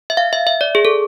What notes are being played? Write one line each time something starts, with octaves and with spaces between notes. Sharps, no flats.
E5
F5
E5
E5
D5
G#4
A4